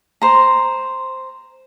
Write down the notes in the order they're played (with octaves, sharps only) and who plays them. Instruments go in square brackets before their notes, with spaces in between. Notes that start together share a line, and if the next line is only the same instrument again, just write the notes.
[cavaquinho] C5 A#5